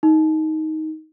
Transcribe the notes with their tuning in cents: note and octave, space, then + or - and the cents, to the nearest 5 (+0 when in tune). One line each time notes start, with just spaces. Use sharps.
D#4 +15